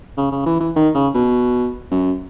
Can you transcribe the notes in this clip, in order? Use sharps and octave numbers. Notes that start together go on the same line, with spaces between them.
C#3
C#3
E3
E3
D#3
C#3
B2
F#2